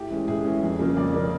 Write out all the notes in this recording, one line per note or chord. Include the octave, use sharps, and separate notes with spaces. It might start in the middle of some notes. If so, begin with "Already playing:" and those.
Already playing: A2 G4
E3 G#3 C#4
A2 G#4
E3 G#3 C#4
F2
C#3 F3 A#3
F2 D5
C#3 F3 A#3